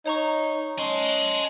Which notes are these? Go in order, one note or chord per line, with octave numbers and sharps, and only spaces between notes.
D#4 C#5 A#5 C#6
C#4 D#5 G#5 A5 C6